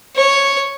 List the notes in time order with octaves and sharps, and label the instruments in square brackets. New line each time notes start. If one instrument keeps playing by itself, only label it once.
[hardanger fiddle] C#5